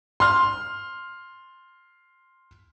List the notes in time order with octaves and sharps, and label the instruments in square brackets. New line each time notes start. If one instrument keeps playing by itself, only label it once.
[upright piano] C6 F6